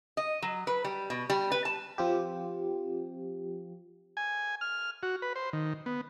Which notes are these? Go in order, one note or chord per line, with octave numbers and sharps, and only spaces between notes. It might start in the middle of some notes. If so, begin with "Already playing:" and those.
D#5
F#3
B4
G3
B2
G3
B4
A5
F3 C4 F4 G4
G#5
F6
F#4
B4
C5
D#3
B3